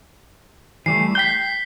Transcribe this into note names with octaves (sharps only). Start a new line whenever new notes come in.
E3 G3 A3 C7
G5 G6 B6 G7